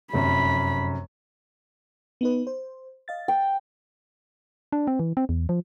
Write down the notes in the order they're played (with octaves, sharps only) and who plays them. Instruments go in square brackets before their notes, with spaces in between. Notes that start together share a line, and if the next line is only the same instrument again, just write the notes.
[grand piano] F1 F#2 [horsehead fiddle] B5
[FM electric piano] B3 D#4 B4
C5
D#5 F5 A6
[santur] G5
[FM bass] D4
C4
E3
C4
E2
F3